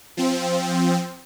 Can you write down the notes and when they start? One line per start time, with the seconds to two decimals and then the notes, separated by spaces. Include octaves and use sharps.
0.17 F3 C4